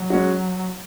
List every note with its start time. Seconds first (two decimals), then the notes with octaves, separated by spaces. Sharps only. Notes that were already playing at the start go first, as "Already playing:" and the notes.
Already playing: F#3
0.10 G#3 C#4 F#4